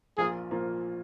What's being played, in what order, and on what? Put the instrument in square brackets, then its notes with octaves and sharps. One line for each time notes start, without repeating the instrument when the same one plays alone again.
[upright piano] A#1 A#2 F3 A#3 F4 [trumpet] G#4
[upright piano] A#2 F3 A#3 F4